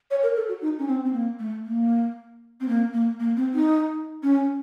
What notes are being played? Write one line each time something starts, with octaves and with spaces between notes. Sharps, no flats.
C#5
A#4
A4
F#4
D#4
C#4
C4
C4
A#3
A3
A#3
C4
A#3
A#3
A#3
C4
D#4
C#4